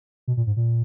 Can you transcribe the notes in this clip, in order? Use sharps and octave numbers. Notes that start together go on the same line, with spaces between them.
B2
A#2
G#2
A#2